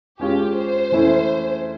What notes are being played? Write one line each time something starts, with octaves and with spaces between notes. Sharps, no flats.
G#3 C#4 F4 G4 G#4
C5
E3 A3 C#4 E4